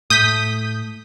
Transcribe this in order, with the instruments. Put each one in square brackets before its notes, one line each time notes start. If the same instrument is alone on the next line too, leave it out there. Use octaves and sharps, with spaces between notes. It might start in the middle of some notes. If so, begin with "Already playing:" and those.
[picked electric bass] A2 [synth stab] D#6 G6 B6